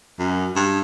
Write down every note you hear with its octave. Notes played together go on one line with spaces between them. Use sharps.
F#2
G2